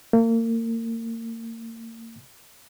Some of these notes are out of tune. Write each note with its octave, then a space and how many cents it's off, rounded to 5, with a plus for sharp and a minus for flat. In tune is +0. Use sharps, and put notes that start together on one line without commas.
A#3 -35